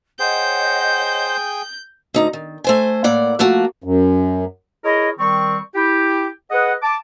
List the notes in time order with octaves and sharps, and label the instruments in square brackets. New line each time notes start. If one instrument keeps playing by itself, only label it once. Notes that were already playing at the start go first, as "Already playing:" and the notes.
[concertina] G#4 G5 [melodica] C5 [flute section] C#5 D#5 F#5 [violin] G6
[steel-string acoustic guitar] D2 D#4 A#5
D#3
A3 C5 G#5
A2 A#3 D5 F#5
F3 A3 A#3 F#4
[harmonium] F#2
[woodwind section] E4 G#4 A#4 C#5 D#5
D#3 G3 C4 C#6
E4 G4
G#4 B4 D#5 F#5
A5 D6